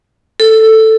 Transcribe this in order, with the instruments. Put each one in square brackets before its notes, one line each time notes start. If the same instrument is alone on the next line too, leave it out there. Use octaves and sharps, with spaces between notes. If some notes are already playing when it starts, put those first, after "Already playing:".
[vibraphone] A4